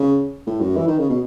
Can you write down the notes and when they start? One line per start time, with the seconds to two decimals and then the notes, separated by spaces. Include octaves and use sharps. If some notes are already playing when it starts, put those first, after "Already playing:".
Already playing: C#3
0.47 A2
0.61 F#2
0.77 E3
0.88 D#3
0.99 C#3
1.10 B2